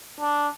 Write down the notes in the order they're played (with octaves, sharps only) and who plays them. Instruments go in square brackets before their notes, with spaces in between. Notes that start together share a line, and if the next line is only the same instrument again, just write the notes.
[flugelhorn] D4